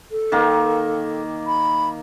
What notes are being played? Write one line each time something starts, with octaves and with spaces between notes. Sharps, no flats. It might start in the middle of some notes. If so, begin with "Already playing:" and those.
A4
D#3 A#3
B5